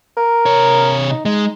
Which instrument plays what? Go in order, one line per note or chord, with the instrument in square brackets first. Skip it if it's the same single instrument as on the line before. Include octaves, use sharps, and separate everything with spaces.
[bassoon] A#4
[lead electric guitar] C3 C#5
[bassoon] D#4
[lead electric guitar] G#3 [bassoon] D#4